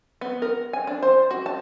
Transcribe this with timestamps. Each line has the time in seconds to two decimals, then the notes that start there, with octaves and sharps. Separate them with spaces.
0.21 B3
0.42 A#4
0.73 G#5
0.87 D4
1.03 C5
1.31 F#4
1.46 A5